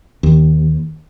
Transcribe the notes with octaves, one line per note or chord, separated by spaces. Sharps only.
D#2